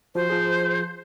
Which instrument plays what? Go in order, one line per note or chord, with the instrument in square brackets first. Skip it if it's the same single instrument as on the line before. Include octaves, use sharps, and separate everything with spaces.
[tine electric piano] F3 F#4 [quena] C5
[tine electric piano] F3 G#4